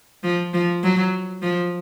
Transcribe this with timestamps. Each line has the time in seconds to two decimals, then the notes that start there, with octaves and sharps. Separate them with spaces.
0.23 F3
0.54 F3
0.83 F#3
1.42 F3